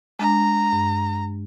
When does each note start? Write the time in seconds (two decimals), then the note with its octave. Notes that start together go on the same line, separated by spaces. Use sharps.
0.19 G#3 D4 A#5
0.72 G2